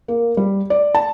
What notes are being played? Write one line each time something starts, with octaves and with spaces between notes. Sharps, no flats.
A#3
G3
D5
A5